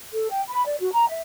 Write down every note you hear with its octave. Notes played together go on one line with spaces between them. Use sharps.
A4
G5
B5
D5
F#4
A#5
E5